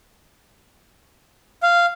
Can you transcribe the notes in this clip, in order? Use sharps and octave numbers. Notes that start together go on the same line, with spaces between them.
F5